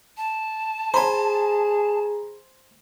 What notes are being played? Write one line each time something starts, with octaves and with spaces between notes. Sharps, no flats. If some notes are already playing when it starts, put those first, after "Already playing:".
A5
G#4 C5 G#5 A#5 B5